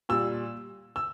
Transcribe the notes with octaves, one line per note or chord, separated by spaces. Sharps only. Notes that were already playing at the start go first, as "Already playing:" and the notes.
A#2 G3 E6
E6